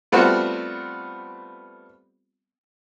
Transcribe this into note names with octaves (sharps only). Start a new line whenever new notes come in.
G3 A3 B3 C4 F4 F#4